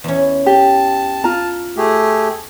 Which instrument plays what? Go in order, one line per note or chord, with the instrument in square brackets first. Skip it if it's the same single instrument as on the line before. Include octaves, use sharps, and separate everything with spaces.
[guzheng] E2 C#4
[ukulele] G4 [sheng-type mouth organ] A5
[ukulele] F4 A#5
[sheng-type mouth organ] A3 G4 G#4